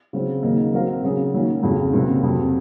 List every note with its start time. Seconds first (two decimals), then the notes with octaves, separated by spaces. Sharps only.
0.13 C#3 F#3 C4
0.43 D#2 C#3 F#3 A#3 D#4
0.73 F#3 C4 F#4 A#4 F5
1.03 C#3 F#3 C#4 G#4
1.33 D#3 F#3 A#3 C#4
1.63 F2 C#3 F#3
1.93 C#2 C3 F#3 A#3
2.23 F2 C3 F#3